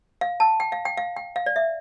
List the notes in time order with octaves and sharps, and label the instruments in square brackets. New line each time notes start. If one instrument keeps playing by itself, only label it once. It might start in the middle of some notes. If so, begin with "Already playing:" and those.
[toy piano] F5
A5
G5
F5
G5
F5
G5
F5
D5
E5